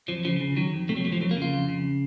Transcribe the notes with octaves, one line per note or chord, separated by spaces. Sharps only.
F2 F3
C#3 F3
C#3
D#3 F#3
F2
C3 A3
F#3
F2 A3
F3
F2 F#3
A#3
C#3
F4
F2
C#3